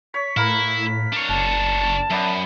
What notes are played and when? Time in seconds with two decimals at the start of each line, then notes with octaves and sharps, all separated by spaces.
0.14 C#5 B6
0.37 A2 E4 A#4 B4 F5
1.13 D4 C#5
1.29 F#1 A5
2.11 F#2 B3 D5 E5